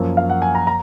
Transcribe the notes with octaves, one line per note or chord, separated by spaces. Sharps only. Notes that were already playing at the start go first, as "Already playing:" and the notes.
Already playing: F#2 F3 A#3
F5
F#5
G#5
A#5
A#5